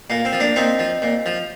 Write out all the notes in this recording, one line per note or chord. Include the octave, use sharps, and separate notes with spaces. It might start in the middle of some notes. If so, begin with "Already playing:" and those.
A#2 A#3
C4
F3
A#3 D4
A#2 C4 D#4
F3
A#2
F3